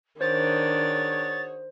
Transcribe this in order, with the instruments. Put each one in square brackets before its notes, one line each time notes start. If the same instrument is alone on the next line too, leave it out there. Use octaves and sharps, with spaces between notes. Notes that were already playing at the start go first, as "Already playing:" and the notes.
[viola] D#3 D4 [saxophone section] F#4 G#4 C#5 [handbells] C5 [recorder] A6